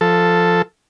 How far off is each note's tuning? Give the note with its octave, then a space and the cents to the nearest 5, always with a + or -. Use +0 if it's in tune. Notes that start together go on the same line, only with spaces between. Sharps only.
F3 +0 A4 +0